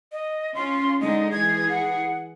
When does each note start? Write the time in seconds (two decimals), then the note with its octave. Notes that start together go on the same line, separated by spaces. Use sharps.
0.12 D#5
0.55 C#4 F4 C6
1.01 D3 G#3 D#4 D#5
1.32 E3 G#4 G#6
1.69 F#5